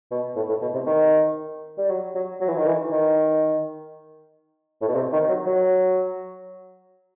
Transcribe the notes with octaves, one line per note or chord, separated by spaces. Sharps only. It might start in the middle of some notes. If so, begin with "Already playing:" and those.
B2
A2
A2
B2
C3
D#3
G3
F#3
F#3
F#3
E3
D#3
E3
D#3
A2
B2
C3
D#3
F#3
F#3